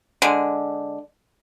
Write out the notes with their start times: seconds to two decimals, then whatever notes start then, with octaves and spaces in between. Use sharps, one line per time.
0.22 D3 G#3